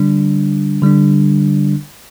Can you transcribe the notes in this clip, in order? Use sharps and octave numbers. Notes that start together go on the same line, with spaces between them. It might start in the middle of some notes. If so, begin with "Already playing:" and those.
Already playing: D3 G3 D4
D3 G3 D4